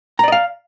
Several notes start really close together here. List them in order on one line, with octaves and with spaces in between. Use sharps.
A#5 D5 D#5 F5